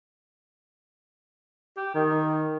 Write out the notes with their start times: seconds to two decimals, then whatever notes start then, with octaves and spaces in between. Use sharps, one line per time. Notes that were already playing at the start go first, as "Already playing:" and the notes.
1.77 G4
1.94 D#3